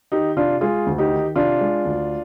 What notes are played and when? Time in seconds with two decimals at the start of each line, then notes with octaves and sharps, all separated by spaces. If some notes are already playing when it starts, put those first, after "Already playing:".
0.12 D#3 D#4 G4
0.36 C3 D4 F4
0.61 G#3 F4 G#4
0.87 D2
0.98 D#4 G4
1.12 D#3
1.36 C3 D4 F4
1.61 G#3
1.85 D2